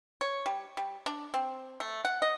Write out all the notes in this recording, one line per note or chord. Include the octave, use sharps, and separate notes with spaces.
C#5
G3
G3
D4
C4
A3
F#5
D#5